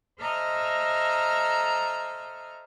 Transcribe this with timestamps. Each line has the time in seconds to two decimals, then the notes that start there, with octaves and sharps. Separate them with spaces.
0.20 A4 C5 D#5 E5 A#5 F6